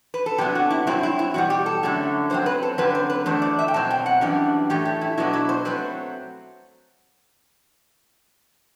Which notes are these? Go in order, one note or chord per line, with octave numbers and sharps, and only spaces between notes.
B4
A4
C3 F#3 B3 D4 G4
F#4
E4
G2 F#3 C4 E4
E4
E4
E2 B2 G3 F#4
G4
A4
F#2 D3 F#3 A3
F#2 F#3 C4 C5
B4
A4
F#2 D3 F#3 C4 B4
C5
B4
E2 D3 A3 D4 C5
D5
E5
G5
B2 F#3 C4 A5
G5
F#5
F#2 E3 G3 D4
A2 E3 A3 G4
G4
E4
B2 F#3 B3 D4 E4
E4
C5
F#3 A3 C4 B4